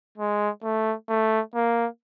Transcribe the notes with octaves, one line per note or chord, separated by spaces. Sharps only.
G#3
A3
A3
A#3